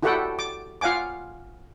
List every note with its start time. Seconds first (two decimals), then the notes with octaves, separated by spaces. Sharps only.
0.03 E4 F#4 G4 A4 F#5 G5
0.39 D6
0.81 F4 F5 F#5 G#5 D6